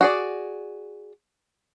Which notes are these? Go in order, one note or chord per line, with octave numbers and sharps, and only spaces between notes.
F#4 G#4 D5